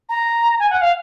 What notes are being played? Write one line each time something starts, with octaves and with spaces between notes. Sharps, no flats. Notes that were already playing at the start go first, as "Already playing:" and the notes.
A#5
G#5
F#5
F5